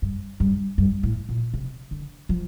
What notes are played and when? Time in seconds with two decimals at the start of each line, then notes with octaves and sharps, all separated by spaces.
0.02 G2
0.40 G2
0.78 G2
1.03 A2
1.29 A#2
1.54 C3
1.91 D3
2.29 F3